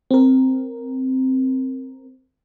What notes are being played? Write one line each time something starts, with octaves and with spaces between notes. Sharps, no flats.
C4 A#4